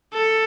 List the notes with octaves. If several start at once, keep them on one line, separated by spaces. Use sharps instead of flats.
A4